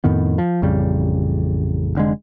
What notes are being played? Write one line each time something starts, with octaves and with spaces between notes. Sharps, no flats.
F2 A2 D#3 B3
F3
A1 F2 C#3 G3
F1 D3 G#3